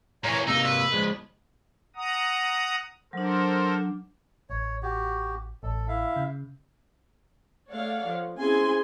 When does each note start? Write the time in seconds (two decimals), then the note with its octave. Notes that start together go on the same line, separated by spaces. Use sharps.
0.24 A#2 E3 C#5 A#5
0.48 C3 A#3 D#4 E6
0.65 B4
0.92 F3 G#3
1.96 F#5 A#5 D#6
3.13 F#3 D4 A4 A#4 C5
4.50 A1 C#5
4.83 F#4 G4
5.63 A1 A4
5.88 E4 E5 F5
6.16 C#3
7.70 A3 A4 C#5 D5 F5 F#5
8.08 F3
8.37 C4 C#4 E4 G#4 G#5 C6